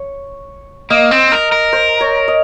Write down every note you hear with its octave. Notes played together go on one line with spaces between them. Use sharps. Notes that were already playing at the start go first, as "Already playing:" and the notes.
Already playing: C#5
A#3 D#5
C4
A#4
A#4
C5
C#5
D#5